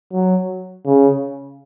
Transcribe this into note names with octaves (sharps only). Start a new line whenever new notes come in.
F#3
C#3